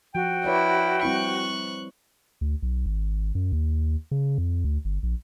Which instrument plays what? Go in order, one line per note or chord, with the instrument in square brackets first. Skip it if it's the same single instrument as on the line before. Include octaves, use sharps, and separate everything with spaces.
[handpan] F3 [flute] F#4 [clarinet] G5
[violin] E4 [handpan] B4 C#5 D5
[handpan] G3 C4 E4 [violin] C#6 F#6
[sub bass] D2
B1
G#1
F#2
D#2
C#3
F2
D2
G1
A#1